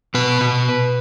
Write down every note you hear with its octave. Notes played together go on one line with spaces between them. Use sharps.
B2 B4
B2